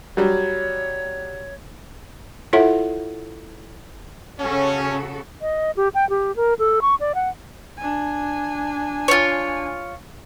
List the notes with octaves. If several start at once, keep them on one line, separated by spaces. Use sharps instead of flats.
F#3 G3 C#5
E4 F4 A4 C#5 E5 F#5
C#3 C#4 F#4 A4
D#5
G4
G5
G4
A#4
A4
C#6
D5
F#5
D4 G#5
F4 C#5